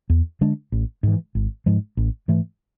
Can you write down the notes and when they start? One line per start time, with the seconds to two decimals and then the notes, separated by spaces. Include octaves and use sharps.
0.10 E2
0.41 D3 G#3 D4
0.72 A1
1.03 G#2 E3
1.35 G#1
1.66 G#2 F3 G#3
1.97 A1
2.28 G#2 E3 A3